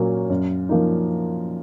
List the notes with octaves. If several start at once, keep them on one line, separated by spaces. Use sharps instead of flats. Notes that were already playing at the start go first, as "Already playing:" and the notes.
Already playing: A#2 F#3 A#3 C#4
F#2
F3 A#3 D#4